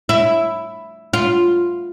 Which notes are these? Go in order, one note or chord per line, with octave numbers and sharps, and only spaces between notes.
E4
F4